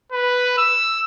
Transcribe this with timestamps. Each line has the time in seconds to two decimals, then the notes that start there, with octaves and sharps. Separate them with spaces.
0.12 B4
0.58 E6